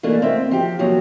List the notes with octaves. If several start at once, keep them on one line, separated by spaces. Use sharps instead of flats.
E3 A3 A#3 D4
C4 E5
F3 G4
D#2 F3 F#3